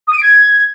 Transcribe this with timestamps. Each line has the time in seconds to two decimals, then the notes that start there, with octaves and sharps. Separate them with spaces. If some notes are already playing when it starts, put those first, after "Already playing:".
0.07 D#6
0.13 D#7
0.18 D7
0.23 G#6